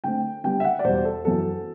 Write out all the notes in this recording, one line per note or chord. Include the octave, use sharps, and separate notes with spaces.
D3 A3 C4 G5
D3 G3 B3 G5
E5
F#5
D5
E2 B2 G3 C5
A4
F#2 E3 B3 A4